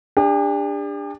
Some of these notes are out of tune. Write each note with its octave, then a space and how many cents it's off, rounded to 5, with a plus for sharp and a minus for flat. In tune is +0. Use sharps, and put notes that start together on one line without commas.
D4 +0 G4 +45